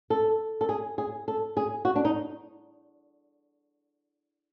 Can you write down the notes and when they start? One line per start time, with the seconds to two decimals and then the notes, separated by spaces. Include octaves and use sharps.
0.10 A4
0.61 A4
0.69 G#4
0.98 G#4
1.28 A4
1.57 G#4
1.85 F#4
1.96 D4
2.05 D#4